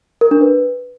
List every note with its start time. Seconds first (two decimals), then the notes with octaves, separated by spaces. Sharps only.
0.21 A#4
0.31 D4
0.41 B4